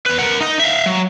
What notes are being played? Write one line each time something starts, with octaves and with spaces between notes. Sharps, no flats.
E2 B4
A#4 F#5
D#4 D#5
E5 F5
F#3